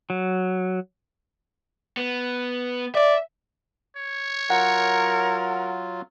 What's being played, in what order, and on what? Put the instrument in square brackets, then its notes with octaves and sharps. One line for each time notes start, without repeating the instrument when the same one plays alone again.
[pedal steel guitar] F#3
[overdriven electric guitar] B3
[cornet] D5 [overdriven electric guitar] E5
[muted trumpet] C#5
[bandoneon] F#3 F4 [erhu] A#4 [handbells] F#5